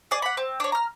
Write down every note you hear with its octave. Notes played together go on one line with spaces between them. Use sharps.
G#4 D5
F#5 B5
C4
D4 C#5
A#5 F6